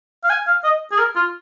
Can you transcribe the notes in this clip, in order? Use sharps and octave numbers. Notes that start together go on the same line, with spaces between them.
F5
G#5
F5
D#5
G#4
A#4
F4